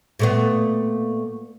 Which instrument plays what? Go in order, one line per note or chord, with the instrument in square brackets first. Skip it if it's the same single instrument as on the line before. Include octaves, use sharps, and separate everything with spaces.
[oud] A#2 A3 B3